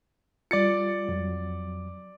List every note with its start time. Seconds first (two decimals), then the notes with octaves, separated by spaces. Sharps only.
0.51 G3 F4 D5 A6 C#7
1.08 F2 F#3